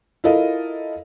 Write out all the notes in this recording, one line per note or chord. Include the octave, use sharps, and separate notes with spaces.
E4 F4 A4 A#4 D#5 F5